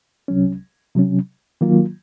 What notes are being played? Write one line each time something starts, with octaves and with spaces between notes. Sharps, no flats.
C2 C3 F#3 C#4
C3 F#3 C#4
D#3 F#3 A#3 F4